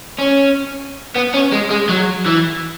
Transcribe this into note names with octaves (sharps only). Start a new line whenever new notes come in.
C#4
B3
C#4
G#3
G#3
F#3
E3